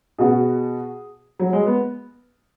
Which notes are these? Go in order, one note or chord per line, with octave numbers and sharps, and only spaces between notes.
B2 B3 F#4 G#4
F#3
G#3
B3